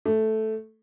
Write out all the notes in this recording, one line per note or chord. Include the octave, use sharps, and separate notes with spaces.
A3